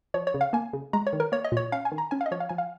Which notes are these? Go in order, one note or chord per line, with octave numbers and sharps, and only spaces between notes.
F3 C#5
C#5
C#3
F5
A#3 G#5
C#3
G#3 A#5
C#5
D#3
A#4
A#3 C#5
D#5
A#2 C#5
C#4 F5
G#5
D#3
A#5
C#4 G#5
F5
D#5
F3 C#5
F5
F3 G#5
F5